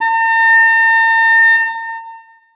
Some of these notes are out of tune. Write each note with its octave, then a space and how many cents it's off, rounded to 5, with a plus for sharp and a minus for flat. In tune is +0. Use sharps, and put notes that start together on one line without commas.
A#5 -45